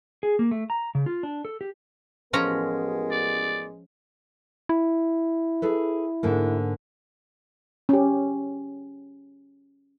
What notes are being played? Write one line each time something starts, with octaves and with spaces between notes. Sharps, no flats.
G#4
A#3
A3
A#5
C#3
F4
D4
A4
G4
A1 F3 G#3 B3 C#4 A#4 A#5
D5
E4
G#4 A4 B4
G#2 D3 A#3
C#4 G4